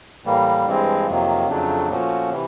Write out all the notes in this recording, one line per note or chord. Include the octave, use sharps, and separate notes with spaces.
A2 E3 G3 A#3
G2 E3 G#3 C4
F2 C3 D#3 F#3 A#3
F2 C#3 F#3 A3 D4
A#2 F3 A3 C#4 F#4
C3 E3